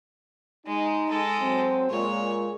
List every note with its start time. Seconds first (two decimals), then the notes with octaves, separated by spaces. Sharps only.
0.66 G#3 D#4
1.09 G#3 A4
1.41 F#3 C4
1.90 A#2 G#3 C#5